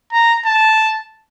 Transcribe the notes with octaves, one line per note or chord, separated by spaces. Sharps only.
A#5
A5